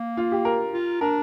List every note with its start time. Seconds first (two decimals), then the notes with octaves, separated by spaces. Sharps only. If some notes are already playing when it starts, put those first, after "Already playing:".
Already playing: A#3
0.17 F4
0.32 G4
0.45 A#4
0.73 F4
1.01 D4 A#4